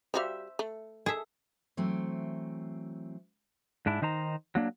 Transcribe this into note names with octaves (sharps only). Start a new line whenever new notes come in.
G3 F#4 C5 E5 F5
A3
G#4 A4 E5
E3 F#3 A3 C4
G#2 D4 E4
D#3 D#4 C5 A#5
F#3 A#3 D4